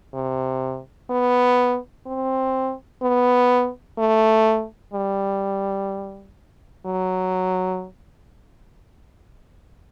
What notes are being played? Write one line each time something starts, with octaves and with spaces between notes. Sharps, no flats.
C3
B3
C4
B3
A3
G3
F#3